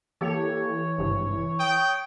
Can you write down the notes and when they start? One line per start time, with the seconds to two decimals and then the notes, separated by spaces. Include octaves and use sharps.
0.21 E3 A#3 G4 A4 C#5
0.98 G#1 G2 C3
1.59 G5 D#6 D7